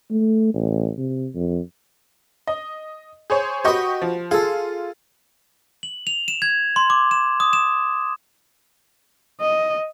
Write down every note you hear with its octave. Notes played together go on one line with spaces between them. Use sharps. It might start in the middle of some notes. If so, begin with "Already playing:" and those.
A3
A1
C3
F2
D#5
G#4 C5 C#5
F#4 G4 B4 D#5 C#6
F3
F4 G#4 A4
F#7
F7
E7
G#6
C6
D6
E7
D#6
E7
D#5